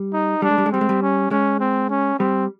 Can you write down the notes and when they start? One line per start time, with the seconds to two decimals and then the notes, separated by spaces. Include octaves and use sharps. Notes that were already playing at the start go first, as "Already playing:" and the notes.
Already playing: G3
0.13 D#4
0.42 G3 D4
0.51 G#3
0.58 G3
0.66 G#3
0.72 G3 C4
0.81 G#3
0.89 G3
1.02 C#4
1.31 G#3 C#4
1.60 C4
1.89 C#4
2.19 G3 C4